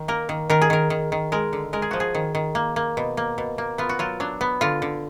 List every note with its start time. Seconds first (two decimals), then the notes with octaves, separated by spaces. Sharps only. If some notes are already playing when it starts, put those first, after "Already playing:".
Already playing: D#3
0.08 A#3 A#4
0.29 D#3
0.50 D#3 A#4
0.61 G#4
0.70 D#3 A#4
0.90 D#3
1.12 D#3
1.32 G#3 A#4
1.53 D3
1.73 G#3 A#4
1.82 G#4
1.91 F3 F#4
2.00 G#4
2.15 D#3
2.35 D#3
2.55 A#3
2.76 A#3
2.97 B2
3.17 A#3
3.38 B2
3.58 A#3
3.78 B3 F4
3.89 F#4
3.99 F#3 F4
4.20 F#3 D4
4.41 B3
4.61 D3 F4
4.82 D3